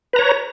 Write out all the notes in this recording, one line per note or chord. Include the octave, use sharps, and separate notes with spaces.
B4 C#5 A#5